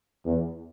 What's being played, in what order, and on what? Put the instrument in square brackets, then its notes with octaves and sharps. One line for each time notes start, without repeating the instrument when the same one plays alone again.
[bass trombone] E2